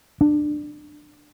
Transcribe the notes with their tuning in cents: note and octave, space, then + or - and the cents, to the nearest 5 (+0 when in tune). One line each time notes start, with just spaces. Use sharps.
D4 +20